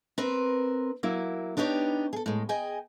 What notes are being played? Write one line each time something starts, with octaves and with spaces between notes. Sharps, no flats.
C4 A#4 B4
F#3 A#3 E4
B3 D4 D#4 G4 C#5
G#4 A4
A2 G#3
G#4 D#5 G5 G#5